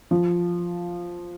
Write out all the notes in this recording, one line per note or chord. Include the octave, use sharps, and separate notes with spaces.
F3